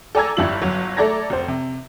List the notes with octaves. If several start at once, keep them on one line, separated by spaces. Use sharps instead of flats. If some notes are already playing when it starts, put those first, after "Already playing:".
A4 D5 G#5 A#5 E6 G#6
G1 G2 G3 E4 F4 F#7
G1 F#3
A3 A4 D5 A#5 G#6 A#6
F1 C5
C3